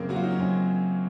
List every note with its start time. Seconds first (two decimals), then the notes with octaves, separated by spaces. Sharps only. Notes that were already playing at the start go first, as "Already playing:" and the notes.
Already playing: F#2 C#3 A#3 C4
0.09 F#3 F#4
0.16 F4
0.23 D#4
0.30 C#4
0.38 F#2 C4